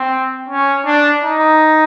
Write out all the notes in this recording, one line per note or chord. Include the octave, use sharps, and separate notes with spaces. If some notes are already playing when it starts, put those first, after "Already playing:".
Already playing: C4
C#4
D4
D#4